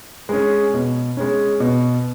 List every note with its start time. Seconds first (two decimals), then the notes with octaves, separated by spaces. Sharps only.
0.29 G#3 C#4
0.73 B2
1.17 G#3 C#4
1.60 B2